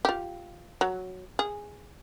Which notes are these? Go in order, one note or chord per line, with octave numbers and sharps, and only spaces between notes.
F4 G4
F#3
G#4